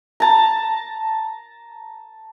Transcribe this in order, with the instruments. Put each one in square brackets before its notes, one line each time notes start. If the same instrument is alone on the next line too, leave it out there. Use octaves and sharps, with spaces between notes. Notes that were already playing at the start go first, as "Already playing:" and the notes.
[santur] A5 A#5